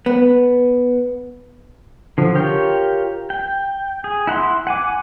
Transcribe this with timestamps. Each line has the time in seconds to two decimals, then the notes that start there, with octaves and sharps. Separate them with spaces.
0.06 B3
2.18 D3 F3
2.35 F4 G4 A#4 C#5 G5
3.30 G5
4.04 G#4
4.27 E4 F#5 A#5 C6
4.67 F#5 G#5 D6